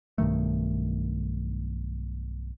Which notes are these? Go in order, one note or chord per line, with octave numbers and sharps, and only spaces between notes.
B1 G2 D#3 A3